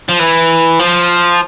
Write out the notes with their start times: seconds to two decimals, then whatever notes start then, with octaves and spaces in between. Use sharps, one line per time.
0.09 F3
0.19 E3
0.79 F3